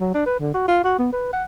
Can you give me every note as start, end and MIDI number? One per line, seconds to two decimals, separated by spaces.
0.01 0.10 54
0.15 0.25 62
0.26 0.38 71
0.40 0.51 50
0.54 0.64 66
0.68 0.81 65
0.84 0.96 66
0.99 1.09 59
1.13 1.29 71
1.33 1.44 78